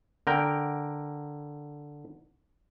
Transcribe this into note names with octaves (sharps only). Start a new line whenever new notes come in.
D3 A#4 G5